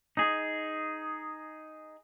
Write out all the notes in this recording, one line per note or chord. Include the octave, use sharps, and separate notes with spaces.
D#4 G#4